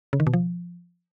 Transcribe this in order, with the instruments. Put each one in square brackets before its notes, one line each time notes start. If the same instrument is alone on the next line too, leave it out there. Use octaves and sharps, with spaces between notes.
[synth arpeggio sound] C#3
D#3
B2
F3